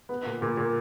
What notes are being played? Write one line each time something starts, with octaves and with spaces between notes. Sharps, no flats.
B3
A#2
A#2
A#2